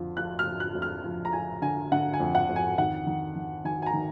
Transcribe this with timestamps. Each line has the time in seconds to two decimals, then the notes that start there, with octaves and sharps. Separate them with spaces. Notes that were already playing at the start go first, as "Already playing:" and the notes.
Already playing: F2 D3 F3
0.17 F3 F#6
0.39 F6
0.47 F2
0.60 F#6
0.75 F2
0.82 F6
1.04 F3
1.25 A#5
1.33 F3 G#5
1.62 D3 G#5
1.92 D3 F#5
2.13 G#5
2.20 F2
2.35 F#5
2.49 F2
2.56 G#5
2.78 D#3 F#5
3.07 D#3
3.36 D#3
3.65 D#3 G#5
3.82 G#5
3.86 A#5
3.94 D#3